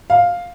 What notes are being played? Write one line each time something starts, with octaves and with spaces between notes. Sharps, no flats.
F5